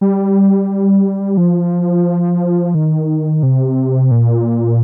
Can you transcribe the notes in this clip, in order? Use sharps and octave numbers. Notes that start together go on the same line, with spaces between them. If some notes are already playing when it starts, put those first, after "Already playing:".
G3
F3
D#3
C3
A#2